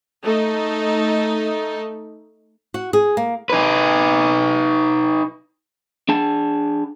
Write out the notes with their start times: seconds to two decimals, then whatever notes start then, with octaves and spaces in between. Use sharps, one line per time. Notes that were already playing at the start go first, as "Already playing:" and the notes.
0.23 A3 D#4
2.74 F#4
2.93 G#4
3.17 A#3
3.50 D#4 B4
6.09 D4 G#4 A5